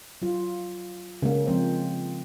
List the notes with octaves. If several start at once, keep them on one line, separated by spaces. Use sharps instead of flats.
F#3 F4
C#3 G#3 A#3 C#4
F3 G#3 C4 C5